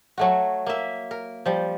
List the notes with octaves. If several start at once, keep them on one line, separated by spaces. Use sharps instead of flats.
F#3 A3 F#4
A#3 E5
A#4
F3 G3